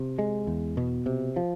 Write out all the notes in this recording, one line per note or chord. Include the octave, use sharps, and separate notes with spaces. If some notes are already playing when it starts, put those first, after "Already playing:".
Already playing: C3
G#3
E2
B2
C3
F3